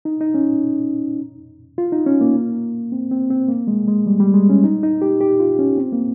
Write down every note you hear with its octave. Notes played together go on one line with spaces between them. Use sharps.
D#4
D#4
C#4
F4
D#4
C#4
A#3
C4
C4
C4
A#3
G#3
G#3
G3
G3
G#3
C#4
D#4
D#4
G4
G4
F4
C#4
C4
A#3